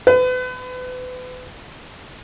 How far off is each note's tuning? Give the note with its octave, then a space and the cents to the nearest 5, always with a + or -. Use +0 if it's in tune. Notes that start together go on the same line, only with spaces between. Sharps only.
B4 +35